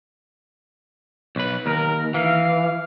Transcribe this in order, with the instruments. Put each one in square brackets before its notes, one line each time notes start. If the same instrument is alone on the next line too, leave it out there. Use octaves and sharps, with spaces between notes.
[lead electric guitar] B1 B4
[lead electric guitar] D#2 [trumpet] A#4
[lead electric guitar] E3 [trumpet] F5